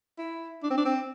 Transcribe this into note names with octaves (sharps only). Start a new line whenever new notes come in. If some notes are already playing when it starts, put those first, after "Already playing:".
E4
D4
C4
D4
C4